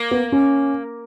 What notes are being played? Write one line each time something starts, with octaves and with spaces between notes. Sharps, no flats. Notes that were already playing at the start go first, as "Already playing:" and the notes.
Already playing: A#3
B3
C#4